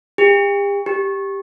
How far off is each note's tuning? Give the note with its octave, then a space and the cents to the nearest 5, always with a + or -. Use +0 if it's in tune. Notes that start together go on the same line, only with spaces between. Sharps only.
G4 +40
G4 +5